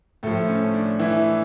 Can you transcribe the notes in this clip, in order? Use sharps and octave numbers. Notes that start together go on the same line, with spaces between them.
A2 F3 A3 A4
C#4
D4
E3 E4